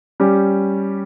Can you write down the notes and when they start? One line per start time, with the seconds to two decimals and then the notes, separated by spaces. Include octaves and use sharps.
0.20 G3 C#4 G4